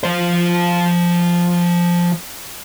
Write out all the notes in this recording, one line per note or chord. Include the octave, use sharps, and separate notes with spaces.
F3 C5